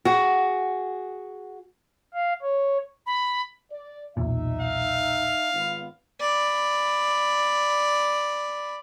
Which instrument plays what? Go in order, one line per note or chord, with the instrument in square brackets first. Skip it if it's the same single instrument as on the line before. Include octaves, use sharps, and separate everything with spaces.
[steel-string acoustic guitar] F#4 G#4
[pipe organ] F5
C#5
[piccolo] B5
[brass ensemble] D5
[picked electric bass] B1 E2 A#2 [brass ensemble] D#4 E5
[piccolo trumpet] F5
[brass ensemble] G#1 B3 F4
[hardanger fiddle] D5 B5